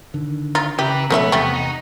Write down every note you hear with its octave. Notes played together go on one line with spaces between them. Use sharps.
D3 D#3
F4 A#5
C#3 G4 B4 E5
B2 F3 G#3 A3 B3 C#4 E5
E2 C3 G3 A3 C4 C#6
D#4